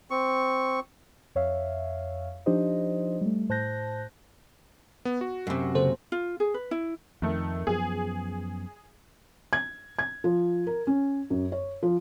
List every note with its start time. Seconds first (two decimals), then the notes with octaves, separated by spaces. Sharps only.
0.11 C4 C#6
1.35 F2 C#5 E5 F5
2.46 F3 D4 D#4 G4 C5 D#5
3.21 G3 A3
3.49 A2 C5 A5 F#6 G6 A#6
5.05 B3
5.21 F#4
5.47 F#2 C3
5.75 C#3 A#3 A4 C5
6.12 F4
6.40 G#4
6.54 B4
6.71 E4
7.22 F2 D#3 A3
7.67 F#2 F3 B3 G#4
9.53 G#6
9.99 G#6
10.24 F3
10.67 A#4
10.87 C#4
11.30 F#2
11.52 C#5
11.83 F3